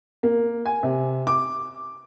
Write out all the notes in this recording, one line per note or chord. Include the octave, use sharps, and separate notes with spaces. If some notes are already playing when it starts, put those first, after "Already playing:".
A#3
G#5
C3
D6